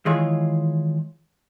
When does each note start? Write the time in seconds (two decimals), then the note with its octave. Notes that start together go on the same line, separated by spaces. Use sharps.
0.06 D#3 E3 G#3 F4 G#4 C#5